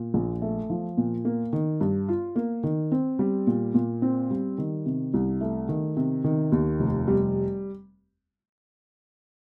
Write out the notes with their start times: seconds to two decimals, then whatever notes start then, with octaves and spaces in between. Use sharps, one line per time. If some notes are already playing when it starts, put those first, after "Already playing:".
Already playing: A#2
0.14 A#1
0.42 A3
0.70 F3
0.97 A#2
1.25 A#3
1.53 D#3
1.81 G2
2.08 F4
2.36 A#3
2.64 D#3
2.92 C4
3.19 G3
3.47 A#2
3.74 A#2
4.02 C4
4.31 G3
4.58 D#3
4.86 C3
5.14 C2
5.41 A3
5.69 D#3
5.97 C3
6.24 D#3
6.52 D#2
6.80 F1
7.08 G3